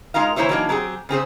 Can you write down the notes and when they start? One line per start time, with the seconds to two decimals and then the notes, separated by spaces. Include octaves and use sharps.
0.14 G#3 D#4 F4 A#4 F5
0.36 E3 A#3 E4 C5 C#5 E5
0.49 E3 F#3 G3 A#3 D4 D#4
0.69 F#3 C4 G4 G#4
1.09 C#3 C4 G#4 C5